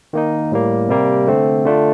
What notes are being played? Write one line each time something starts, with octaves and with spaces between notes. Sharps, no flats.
D#3 A#3 D#4
A2 G3 A#3
C3 G3 A#3
D3 A3 C4
D3 A3 D4 F4